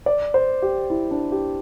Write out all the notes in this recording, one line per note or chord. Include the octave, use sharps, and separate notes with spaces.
D5
C5
G4
E4
D4
G4